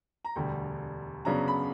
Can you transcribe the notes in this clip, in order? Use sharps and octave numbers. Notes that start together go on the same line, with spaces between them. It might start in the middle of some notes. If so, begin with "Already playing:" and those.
A#5
E1 D2 D3 G3 G5
F#2 C#3 F#3 B3 D4 A#5
B5